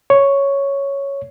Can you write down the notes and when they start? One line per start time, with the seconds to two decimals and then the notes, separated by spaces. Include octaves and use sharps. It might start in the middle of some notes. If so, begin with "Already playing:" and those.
0.10 C#5